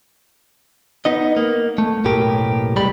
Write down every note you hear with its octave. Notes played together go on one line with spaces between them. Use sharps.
B3 D#4 D#5
A#3
A3
B1 F#2 A2 A#3 G4 A#4
C2 G3 G#3 G4 B5